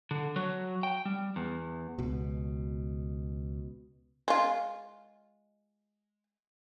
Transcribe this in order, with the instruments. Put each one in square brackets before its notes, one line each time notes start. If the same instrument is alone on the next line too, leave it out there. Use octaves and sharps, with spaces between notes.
[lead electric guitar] D3
F#3
G5
G3
E2
[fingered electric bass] C#2 B2
[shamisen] G#3 F4